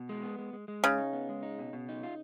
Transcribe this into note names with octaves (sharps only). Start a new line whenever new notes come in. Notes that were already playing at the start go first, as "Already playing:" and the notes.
Already playing: B2
G#3
B3
G#3
G#3
G#3
C#3 D#4
D#4
B3
G#3
D#4
B2
B2
D#4
F4